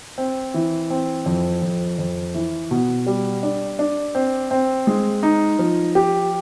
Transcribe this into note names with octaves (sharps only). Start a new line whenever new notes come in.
C4
E3
C4
F2
F2
F2
E3
B2
G3
D4
D4
C4
C4
G#3
D#4
F3
G4